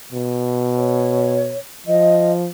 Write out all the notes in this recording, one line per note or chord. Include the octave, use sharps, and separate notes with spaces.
B2
C#5
F3 D#5